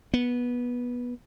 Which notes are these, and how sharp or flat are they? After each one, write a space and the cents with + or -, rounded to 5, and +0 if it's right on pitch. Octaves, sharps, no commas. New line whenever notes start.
B3 -15